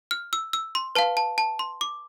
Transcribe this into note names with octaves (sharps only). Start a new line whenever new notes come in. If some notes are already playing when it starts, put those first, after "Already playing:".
F6
E6
E6
C6
B4 F5 A5
A5
A5
C6
D6